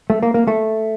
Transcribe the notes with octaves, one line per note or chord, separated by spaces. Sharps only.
A3
A#3
A#3
A3